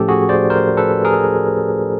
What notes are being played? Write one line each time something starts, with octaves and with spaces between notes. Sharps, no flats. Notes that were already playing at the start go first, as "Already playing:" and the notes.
Already playing: A2 F3 A3 C#4 G4 A4
F#4 G#4
C5 D5
A#4 C5
A4 B4
G#4 A#4